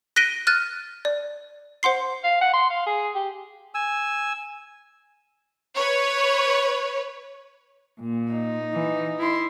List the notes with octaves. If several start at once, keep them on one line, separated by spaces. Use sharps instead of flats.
F#6 A#6 B6 D7 D#7 G7
F6 F#6 A6 D#7
D5
C5 F#5 C6 C7
F5
F#5
C6
F5
G#4
G4
G#5 E6
B4 C#5
A#2
D#4
E3
E4 C6